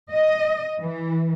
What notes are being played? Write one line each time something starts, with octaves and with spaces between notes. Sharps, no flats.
D#5
E3